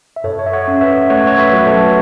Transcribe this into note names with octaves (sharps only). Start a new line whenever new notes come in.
E5
F#2 A4 C#5
C#5
E5
C#5 F#5
C#4
B4 E5
A3 C#5 F#5
C#5
B4 E5
F#3
B4
A4 C#5